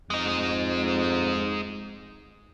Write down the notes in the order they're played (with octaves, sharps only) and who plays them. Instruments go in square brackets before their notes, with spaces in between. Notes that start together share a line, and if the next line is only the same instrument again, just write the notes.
[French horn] F2 [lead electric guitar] G#3 D#4